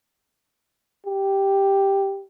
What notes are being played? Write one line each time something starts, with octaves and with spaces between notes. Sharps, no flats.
G4